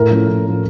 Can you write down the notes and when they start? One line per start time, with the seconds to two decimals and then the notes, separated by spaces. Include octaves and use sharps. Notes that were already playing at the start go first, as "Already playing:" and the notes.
Already playing: A2 A#4
0.11 F3 A3 C#4
0.28 A2
0.45 F3 A3 C#4